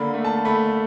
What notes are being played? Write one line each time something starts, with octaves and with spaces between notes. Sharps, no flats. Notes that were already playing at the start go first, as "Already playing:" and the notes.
Already playing: D3 A#3 B5
A3
A5
A3 B5